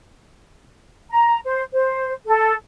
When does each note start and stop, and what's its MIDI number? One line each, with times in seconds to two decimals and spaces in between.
1.10 1.39 82
1.45 1.63 72
1.73 2.14 72
2.27 2.54 69